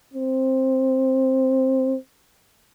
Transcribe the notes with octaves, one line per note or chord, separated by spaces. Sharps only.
C4